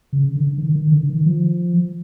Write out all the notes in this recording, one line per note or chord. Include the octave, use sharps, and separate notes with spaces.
C#3
D3
D#3
D#3
D3
D#3
F3